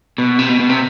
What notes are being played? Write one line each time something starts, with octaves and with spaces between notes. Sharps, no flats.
B2
C3
B2
B2
C3